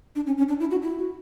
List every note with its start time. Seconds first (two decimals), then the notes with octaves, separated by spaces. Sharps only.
0.16 D4
0.27 C#4
0.38 C#4
0.48 D4
0.60 E4
0.71 F#4
0.82 E4
0.98 F#4